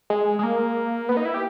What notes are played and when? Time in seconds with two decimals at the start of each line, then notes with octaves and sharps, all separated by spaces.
0.10 G#3
0.39 G#3
0.43 A#3
1.09 B3
1.17 D#4
1.25 E4
1.34 G4